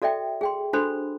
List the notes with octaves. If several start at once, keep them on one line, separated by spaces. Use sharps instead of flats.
F#4 A4 D5 E5 G5
G#4 G5 C6
D4 F#4 A4 C5 B5 C6